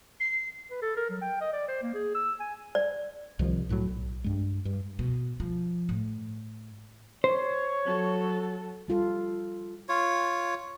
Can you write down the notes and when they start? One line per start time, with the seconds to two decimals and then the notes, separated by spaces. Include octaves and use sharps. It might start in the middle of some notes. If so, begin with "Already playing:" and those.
0.20 C7
0.71 B4
0.82 A4
0.97 A#4
1.10 F#3
1.21 G5
1.41 D#5
1.53 D5
1.68 C5
1.83 A#3
1.94 G#4
2.15 E6
2.40 G#5
2.75 D5
3.39 C2 C3 D#3 F3
3.69 C2 A2 D#3 F#3
3.88 B1
4.24 G2 G#3
4.65 G2
4.99 B2
5.40 F3
5.89 A2
7.24 C5 C#5
7.85 F#3 A4
8.88 G3 F4 A4
9.89 F4 C#5